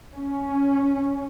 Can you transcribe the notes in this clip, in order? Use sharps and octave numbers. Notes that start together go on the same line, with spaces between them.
C#4